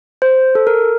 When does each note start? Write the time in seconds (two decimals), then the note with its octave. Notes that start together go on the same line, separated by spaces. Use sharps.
0.22 C5
0.55 A4
0.67 A#4